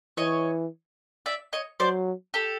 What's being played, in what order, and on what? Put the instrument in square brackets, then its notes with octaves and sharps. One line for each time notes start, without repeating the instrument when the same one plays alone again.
[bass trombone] E3 [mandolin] C#5 D#5
[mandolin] D5 E5
C#5 D#5
[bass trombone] F#3 [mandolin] C5 D5
[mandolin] G4 A4